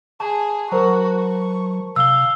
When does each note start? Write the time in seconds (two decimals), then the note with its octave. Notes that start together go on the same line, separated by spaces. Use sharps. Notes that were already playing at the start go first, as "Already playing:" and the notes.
0.20 G#4 A5
0.72 F#3 F#4 A#4 C5 A#5
1.19 C#6
1.96 C3 F5 E6 G7